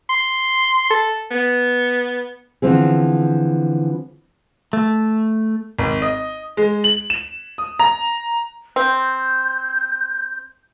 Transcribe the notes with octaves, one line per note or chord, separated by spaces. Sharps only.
C6
A4
B3
D3 E3 F3 C4 G#4
A3
G#1
D#5
G#3
F#7
E7
D#6
A#5
C4 G6